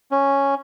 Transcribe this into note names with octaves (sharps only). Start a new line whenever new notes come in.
C#4